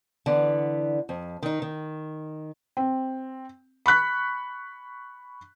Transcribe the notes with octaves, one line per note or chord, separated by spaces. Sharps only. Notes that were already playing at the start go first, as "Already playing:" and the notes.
D3 E3 B3
F2
D#3 D#4
D#3
C4
B5 C#6 F#6 B6